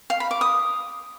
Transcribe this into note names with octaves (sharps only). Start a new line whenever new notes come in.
F5
B5
D6
D#6